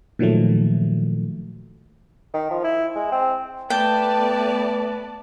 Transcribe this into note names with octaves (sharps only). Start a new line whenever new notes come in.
A#2 D#3 F3 F#3 A3
D#3
F3
E4
G#3
C4
A3 B3 B4 D5 G5 A5